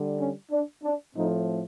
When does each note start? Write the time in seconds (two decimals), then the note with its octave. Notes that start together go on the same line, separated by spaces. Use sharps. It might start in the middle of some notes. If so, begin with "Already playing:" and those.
Already playing: D3 G3
0.19 C#4
0.51 D4
0.84 D4
1.16 A2 F3 A3 C4 D#4